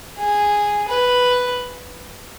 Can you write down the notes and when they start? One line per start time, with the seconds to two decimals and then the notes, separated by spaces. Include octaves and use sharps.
0.19 G#4
0.88 B4